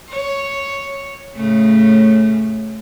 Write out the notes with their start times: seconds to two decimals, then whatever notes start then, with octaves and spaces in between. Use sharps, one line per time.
0.10 C#5
1.36 A2 C#3 A3